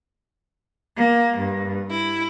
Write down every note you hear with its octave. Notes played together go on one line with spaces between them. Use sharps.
A#3
G2
E4